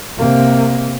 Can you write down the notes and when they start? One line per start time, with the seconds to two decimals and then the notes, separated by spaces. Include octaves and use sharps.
0.17 C3 A#3